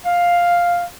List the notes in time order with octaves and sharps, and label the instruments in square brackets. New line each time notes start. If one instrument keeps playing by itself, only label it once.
[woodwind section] F5